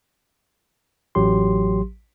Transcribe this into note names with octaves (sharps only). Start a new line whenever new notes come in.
A1 F#3 G4 C6